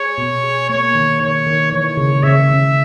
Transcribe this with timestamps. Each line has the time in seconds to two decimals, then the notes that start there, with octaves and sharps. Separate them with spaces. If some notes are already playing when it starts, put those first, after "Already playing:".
Already playing: G#4 C#5
0.18 B2
0.43 G#4
0.69 A#3 C#5
0.95 D#3
1.21 D#3 C#5
1.47 D#3
1.71 E3 C#5
1.97 C#3
2.23 C#3 E5
2.50 C#3